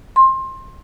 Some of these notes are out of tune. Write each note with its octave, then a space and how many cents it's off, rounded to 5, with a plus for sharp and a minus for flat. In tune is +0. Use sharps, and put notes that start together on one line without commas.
C6 +20